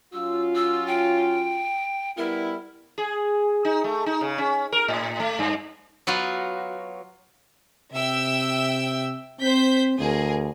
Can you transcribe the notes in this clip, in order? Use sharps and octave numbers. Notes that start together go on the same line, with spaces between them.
F#3 C#4 F4 E6
E6
G5
G3 B3 E4 A#4
G#4
D#4
A3
D#4
C#3
C#4
A#4
A2
A3
G2
F#3 B3 F4 F#4
C3 E5 G5 E6
C4 C5 G6 B6
D2 G#4 A#4